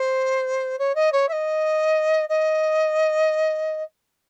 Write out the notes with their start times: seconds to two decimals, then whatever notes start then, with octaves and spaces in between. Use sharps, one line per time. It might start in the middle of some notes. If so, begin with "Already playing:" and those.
Already playing: C5
0.78 C#5
0.95 D#5
1.12 C#5
1.28 E5
1.32 D#5
2.29 D#5